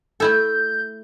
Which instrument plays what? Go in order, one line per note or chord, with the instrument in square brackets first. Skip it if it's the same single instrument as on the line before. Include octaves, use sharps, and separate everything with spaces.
[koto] A3 E4 A4 [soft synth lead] G6